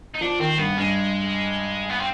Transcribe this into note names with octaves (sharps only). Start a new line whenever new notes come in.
D#4
F3 D4
D#3 C4
G2 B3
G2 G#3
B3
C4